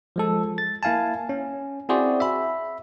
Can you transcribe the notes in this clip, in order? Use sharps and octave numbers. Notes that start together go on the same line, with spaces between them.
F3 G#3 A4
A6
A#3 E4 F5 G#5 A5
C#4
C4 E4 F#4 G#4 C5 D5
E5 B5